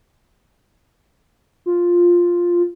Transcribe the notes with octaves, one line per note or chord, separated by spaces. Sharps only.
F4